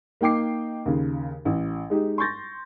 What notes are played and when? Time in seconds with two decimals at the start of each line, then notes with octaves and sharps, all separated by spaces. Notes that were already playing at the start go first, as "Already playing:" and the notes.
0.21 A#3 D#4 G5 D6 C7
0.86 D#2 C#3
1.45 A1
1.90 G#3 D#4 G4
2.18 C6 C#6 G6 A6 A#6